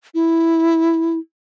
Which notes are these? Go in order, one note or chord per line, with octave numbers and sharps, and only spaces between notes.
E4